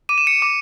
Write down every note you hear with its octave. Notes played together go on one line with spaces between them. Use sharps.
D6 D#7
E7
C#7 D#7
D6